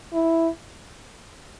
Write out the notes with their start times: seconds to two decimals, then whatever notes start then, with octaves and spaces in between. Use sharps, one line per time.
0.13 E4